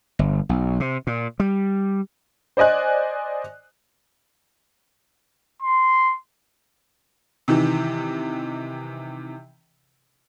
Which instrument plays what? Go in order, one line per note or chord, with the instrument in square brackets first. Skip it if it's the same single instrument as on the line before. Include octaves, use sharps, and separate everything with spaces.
[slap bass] G1
B1
C3
A#2
G3
[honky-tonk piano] C5 D5 D#5 G#5 F#6
[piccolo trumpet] C6
[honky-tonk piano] C3 D#3 E3